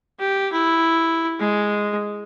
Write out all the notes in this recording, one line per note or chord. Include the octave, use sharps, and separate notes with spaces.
G4
E4
G#3